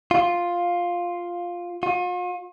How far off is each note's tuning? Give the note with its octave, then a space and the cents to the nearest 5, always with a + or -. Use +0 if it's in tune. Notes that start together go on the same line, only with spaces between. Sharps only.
F4 +5
F4 +45